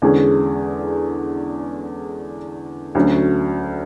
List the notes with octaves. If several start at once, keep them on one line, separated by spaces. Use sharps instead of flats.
E2 D3 G#3 C#4 G#4
D2 D3 F#3 C#4 F#4